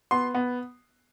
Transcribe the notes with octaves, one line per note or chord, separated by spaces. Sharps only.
B3 C6
B3